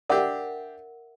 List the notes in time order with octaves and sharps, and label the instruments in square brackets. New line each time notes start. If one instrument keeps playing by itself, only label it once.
[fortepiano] D4 G4 [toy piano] A#4 E5 F#5